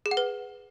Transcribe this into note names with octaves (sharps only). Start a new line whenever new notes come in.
G#4
F#5
B4